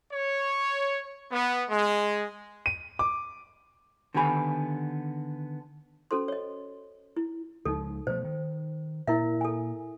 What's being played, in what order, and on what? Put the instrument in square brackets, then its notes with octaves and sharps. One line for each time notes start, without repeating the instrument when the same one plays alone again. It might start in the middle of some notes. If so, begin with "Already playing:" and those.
[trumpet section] C#5
B3
G#3
[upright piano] D#7
D6
[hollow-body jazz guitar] D3 D#3 B3 G4 G#5 B5
[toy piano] C#4 F#4 A4 C5 C6
C#5 D#5
E4
[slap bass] C#2 F3 G#3 [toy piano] D#4 A4
[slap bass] B2 F3 A3 [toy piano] C5
[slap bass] D#3
[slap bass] A#2 [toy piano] E4 A#4 E5
[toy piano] A4 G#5